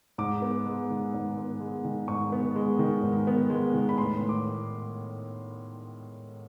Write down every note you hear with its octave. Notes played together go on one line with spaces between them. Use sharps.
G#2 D6
B3
G#3
D#3
G#2
B3
G#3
D#3
G#2 C#6
B3
G#3
D#3
G#2
B3
G#3
D#3
B5
A2 C6
A2
D6